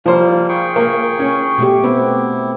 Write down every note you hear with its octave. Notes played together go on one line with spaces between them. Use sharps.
F3 G3 A#3 F4 C5
G#4 G5 C#6
A#3
C#4
B2 A3 G4
B3 C4 E4